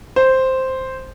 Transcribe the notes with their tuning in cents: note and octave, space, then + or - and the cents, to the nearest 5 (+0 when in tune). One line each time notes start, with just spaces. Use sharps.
C5 +0